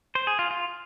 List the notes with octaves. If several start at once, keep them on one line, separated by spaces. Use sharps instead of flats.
C5
G#4
F4
F4